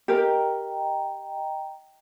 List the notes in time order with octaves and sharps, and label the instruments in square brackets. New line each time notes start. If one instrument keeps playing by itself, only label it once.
[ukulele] G4 A#4 [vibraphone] D#5 G5 A#5